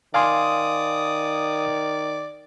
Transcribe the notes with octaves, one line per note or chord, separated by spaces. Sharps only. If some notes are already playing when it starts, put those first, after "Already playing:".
D#3 D5 F5 G#5 C6 D#6